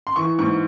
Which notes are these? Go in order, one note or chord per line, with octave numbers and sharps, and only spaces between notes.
C6
E3 C#6
G#2 C#6